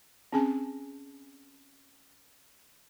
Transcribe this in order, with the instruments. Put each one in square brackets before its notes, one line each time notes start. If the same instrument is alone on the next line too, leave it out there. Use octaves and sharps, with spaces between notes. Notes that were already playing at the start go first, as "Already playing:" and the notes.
[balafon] C4 C#4 G#4 G#5 A5